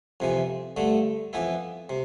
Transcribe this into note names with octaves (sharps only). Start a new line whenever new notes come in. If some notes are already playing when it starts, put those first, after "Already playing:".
F2 C3 E3
G2 D3 A3
F2 E3 B3 E4
C3